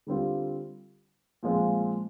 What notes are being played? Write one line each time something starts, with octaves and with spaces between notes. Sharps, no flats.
D3 G3 C4 F4
A#2 F3 G#3 C4 F4